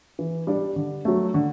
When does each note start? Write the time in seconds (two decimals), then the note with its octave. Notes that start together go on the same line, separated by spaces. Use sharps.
0.19 E3
0.47 G3 D4 G4 D5
0.76 D3
1.05 F#3 A3
1.34 D3